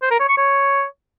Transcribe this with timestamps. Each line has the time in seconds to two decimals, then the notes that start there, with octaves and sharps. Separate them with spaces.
0.02 C5
0.11 A#4
0.20 C#5
0.29 C#6
0.38 C#5